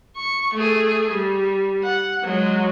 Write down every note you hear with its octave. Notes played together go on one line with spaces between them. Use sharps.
C#6
A3 G#4
G3
F#5
F#3 G#3